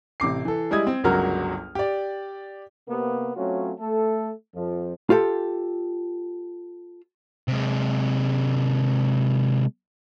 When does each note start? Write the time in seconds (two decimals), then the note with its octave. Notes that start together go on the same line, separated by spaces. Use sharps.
0.20 A1 C3 D6 C7
0.45 E3 A4
0.71 G3 G#3 E4 D#5 D#6 G#6
0.87 C4
1.04 G1 C#2 F#3 F#4 A#4 F6
1.75 G4 D5
2.88 C3 A#3 B3
3.35 F#3 A3 C4 C#4 F4 F#4
3.80 A3 A4
4.55 F2 F3
5.10 F4 G4 A4
7.48 C3 G#3